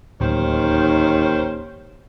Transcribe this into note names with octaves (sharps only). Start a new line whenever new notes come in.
D1 D#2 D#3 C#4 C5